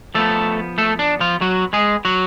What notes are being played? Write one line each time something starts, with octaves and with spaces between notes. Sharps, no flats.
F3 A3 B3 A4
A3 A4
D4
F3 F4
F#3 F#4
G#3 G#4
F#3 F#4